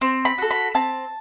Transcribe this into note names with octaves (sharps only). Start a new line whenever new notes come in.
C4
B5
F#4 A4
B5
C4 A5